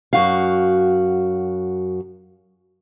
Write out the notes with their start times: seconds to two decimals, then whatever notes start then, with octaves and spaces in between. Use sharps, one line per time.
0.13 F#2 F#4 F5